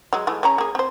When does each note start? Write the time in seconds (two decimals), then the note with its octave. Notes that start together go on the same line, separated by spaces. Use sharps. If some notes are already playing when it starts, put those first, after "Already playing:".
0.13 F#3 G#3
0.27 E3 G#3 A3
0.43 C#3 C#4 A#5
0.58 A#3 G#4
0.75 C4 C5